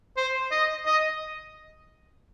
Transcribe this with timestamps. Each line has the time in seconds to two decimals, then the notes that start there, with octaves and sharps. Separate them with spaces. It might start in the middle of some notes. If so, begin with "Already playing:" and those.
0.17 C5
0.51 D#5
0.86 D#5